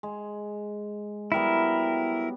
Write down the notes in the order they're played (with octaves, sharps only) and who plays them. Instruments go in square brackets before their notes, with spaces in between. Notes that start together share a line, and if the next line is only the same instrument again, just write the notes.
[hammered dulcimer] G#3
[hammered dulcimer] F#3 G3 B3 [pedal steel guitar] E4 A#4